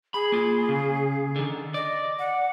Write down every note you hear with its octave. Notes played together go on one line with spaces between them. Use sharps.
G#4 B5
A#3 F4
C#3
D3 D#3
D5 D#5
F#5